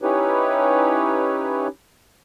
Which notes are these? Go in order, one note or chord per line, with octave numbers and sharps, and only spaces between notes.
C#4 D#4 E4 G4 B4 C#5